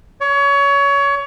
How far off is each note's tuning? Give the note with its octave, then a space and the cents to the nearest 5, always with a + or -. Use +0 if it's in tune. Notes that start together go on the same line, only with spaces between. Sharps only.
C#5 +25